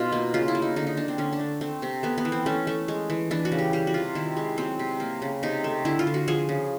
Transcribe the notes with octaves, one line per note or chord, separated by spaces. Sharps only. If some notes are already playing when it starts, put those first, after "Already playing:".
Already playing: B2 D#4 F4
A#3
C#3 F4
E4
A#3
D#4
D3 D#4
D#4
D3 D4
C4
D3 C#4
D4
A3
A3 C4
C3 C4
A3 B3
B3
E3
C4
A3 C#4
A3
G#3
E3
E3 D4
F#4
C#3
G4
G3 G4
F#4
C3 F4
D#3 E4
G#3
F#3 C4
C3
A#3
C#3
C3 D#4
A3
D3 E4
F4
D3
F#4
F3 G#4
C#3